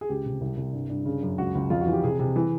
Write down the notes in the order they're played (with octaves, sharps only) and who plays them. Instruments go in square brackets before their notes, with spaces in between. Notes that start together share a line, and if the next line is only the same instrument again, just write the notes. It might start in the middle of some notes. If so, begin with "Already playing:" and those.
[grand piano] G#4
C#2 G4
C3
C2
C2
G2
G2
C#3
F#2
C#2 F#4
C#2
F2 F4
F#4
E3
G4
C3 G#4
C3
E3